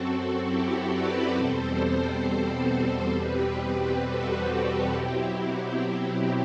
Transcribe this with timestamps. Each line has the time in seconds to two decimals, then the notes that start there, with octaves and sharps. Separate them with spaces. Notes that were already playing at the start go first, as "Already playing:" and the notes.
Already playing: F#2 F#3 C4 F#4 A4
0.46 E4 G4
0.91 B4 D5
1.35 E2 B2 G3 C4 A4 C5
3.14 E2 B2 G3 C4 G4 B4
4.03 F#4 A4
4.92 B2 F#3 C4 E4 G4